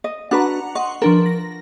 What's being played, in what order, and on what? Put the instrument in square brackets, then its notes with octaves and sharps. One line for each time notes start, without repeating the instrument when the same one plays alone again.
[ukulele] D#5
[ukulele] D4 F#4 B4 [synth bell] F#5 A#5
[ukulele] D#5 [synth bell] F#5 C6 C#6
[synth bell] F3 D4 B4 [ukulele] A#4
[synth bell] A#6